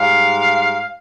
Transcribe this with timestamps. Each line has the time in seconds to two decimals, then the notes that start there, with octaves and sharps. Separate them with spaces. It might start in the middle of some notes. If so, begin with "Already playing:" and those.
Already playing: G#2 G3 F5